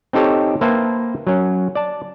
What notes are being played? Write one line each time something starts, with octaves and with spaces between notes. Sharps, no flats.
C4 D#4 G4 A4 C#5
A#3 B4 C5 E5 G5 A5
F#3 C#4
D5 A5